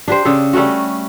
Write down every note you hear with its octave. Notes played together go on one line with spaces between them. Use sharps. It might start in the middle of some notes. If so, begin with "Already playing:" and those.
D4 G4 C5
C#3 D4 G4 A4
G3 A3 C#4 F#4